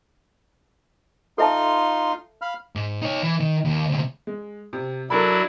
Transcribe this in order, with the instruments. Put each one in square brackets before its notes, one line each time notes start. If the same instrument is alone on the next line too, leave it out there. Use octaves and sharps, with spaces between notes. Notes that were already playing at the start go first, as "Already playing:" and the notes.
[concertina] D#4 F4 C6 [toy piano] A4 E5 A5
[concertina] F5 B5 F6
[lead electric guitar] G#2
D#4 C#5
E3
D#3
D#2
D2 C3
[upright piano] G#3
C3
[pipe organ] F#3 D4 E4 [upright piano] A4 A#4 B5